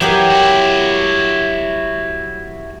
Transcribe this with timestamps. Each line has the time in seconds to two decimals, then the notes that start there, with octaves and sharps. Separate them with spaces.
0.01 E3 F#3 G4 A#4
0.30 E4 F#4